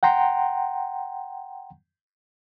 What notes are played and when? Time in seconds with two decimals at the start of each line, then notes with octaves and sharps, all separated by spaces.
0.03 F#5 G5 A#5 C6